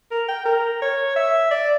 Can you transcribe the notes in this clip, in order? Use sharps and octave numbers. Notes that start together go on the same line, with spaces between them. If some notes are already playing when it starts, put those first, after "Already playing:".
A#4
G5
A#4
C#5
E5
D5